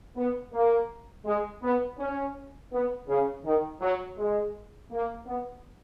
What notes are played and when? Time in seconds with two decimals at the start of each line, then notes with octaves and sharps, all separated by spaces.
0.16 B3
0.53 A#3
1.25 G#3
1.62 B3
1.99 C#4
2.72 B3
3.08 C#3
3.44 D#3
3.81 F#3
4.17 G#3
4.91 A#3
5.26 B3